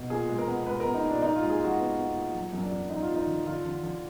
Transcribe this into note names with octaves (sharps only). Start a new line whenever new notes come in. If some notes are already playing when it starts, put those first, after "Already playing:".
Already playing: B2
A#2 G#4
G#3
A#4
B3
G#3 B4
B3 A#4
D#4
A#2
D4
A#2 D#4
F4
G#3
G#4
G#3 F#4
B3
B3
A#2
F#3
F#2
D4
F#2
F#2 D#4
F4
F#2
D#4
D3
D3 F4
D3
D3